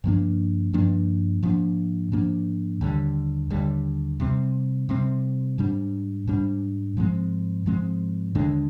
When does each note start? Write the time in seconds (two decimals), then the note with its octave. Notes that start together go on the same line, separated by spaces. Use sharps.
0.04 G2 F3 A#3 D4
0.73 G2 F3 A#3 D4
1.43 G#2 F3 A#3 D4
2.12 G#2 F3 A#3 D4
2.81 D#2 D3 G3
3.50 D#2 D3 G3
4.20 C3 G3 C4
4.89 C3 G3 C4
5.58 G#2 G3 D4
6.27 G#2 G3 D4
6.97 G#2 F3 G#3 C4
7.66 G#2 F3 G#3 C4
8.35 D#2 D3 G#3 D4